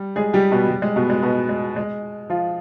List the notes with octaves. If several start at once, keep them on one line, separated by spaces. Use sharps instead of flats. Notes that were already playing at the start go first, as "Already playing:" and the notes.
Already playing: G3
G#3 G#4
G3 G4
B2 B3
G3
G#3
B2 B3
G#3
B2 B3
G#3
G#3
F3 F4